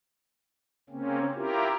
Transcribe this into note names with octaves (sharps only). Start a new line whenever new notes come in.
C#3 A#3 C4 C#4
E4 F4 G4 A#4